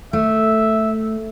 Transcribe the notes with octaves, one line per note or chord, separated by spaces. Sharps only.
A3 E5